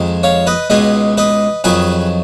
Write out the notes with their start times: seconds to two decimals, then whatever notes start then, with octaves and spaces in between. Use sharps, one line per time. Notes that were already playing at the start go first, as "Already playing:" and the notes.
Already playing: F2 D#3 G#3
0.23 C#5 F5
0.47 B4 D#5
0.70 C#2 B2 G#3 B4 D#5
1.17 B4 D#5
1.64 F2 D#3 F#3 G#4 B4